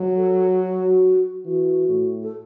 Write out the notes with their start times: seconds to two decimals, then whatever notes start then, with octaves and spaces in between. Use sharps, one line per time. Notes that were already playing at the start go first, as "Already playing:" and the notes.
Already playing: F#3
0.16 A4
0.59 F#4
1.45 E3 F#4
1.89 A2
2.22 A4